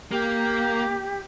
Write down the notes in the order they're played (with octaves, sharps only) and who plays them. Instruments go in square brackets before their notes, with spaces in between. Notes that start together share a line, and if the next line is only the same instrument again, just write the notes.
[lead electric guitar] A#3 [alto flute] G4